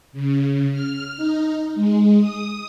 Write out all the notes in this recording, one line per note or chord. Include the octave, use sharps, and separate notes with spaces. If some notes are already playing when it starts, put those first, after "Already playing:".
C#3
F6
D#4
G#3
D#6